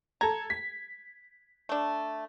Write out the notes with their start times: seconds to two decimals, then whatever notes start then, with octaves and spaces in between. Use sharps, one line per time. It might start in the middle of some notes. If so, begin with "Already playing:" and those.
0.21 A4 A#5 G#6
0.50 B6
1.69 A3 D4